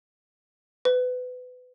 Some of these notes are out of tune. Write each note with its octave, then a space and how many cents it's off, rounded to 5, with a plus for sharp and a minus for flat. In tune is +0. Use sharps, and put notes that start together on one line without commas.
B4 +25